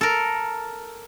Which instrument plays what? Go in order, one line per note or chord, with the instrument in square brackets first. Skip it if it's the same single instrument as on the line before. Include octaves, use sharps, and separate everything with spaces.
[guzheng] A4 A#4